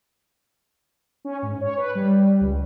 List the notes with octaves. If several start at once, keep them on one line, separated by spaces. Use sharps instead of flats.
C#4
G#2
C#5
B4
G3
C#2